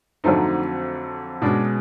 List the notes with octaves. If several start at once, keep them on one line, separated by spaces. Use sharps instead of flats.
F2 D3 F#3 A3 C4 D#4
B2 G#3 C#4 D4